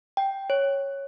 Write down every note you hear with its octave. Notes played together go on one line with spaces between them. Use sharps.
G5
C#5